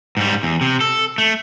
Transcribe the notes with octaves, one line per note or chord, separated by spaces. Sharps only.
G#2 G3
E2
C3
A4
A3